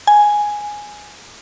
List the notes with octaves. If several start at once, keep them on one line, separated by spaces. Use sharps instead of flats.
G#5